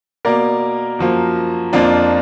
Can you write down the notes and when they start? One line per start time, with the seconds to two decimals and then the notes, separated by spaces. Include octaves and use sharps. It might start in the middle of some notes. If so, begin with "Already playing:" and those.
0.25 B2 A#3 A#4 D5
0.99 F#2 F3 A#3
1.73 F2 F3 A#3 D4 F4